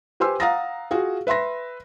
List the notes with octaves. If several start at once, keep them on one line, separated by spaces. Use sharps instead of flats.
G4 B4 C5 G#5 C6 E6
F5 F#5 A#5 D#6 A6 A#6
F4 F#4 G#4 F5
B4 E5 B5 C6 A#6